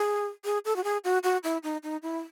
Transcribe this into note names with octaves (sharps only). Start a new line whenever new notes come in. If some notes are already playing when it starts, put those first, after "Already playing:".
Already playing: G#4
G#4
A4
F#4
G#4
F#4
F#4
E4
D#4
D#4
E4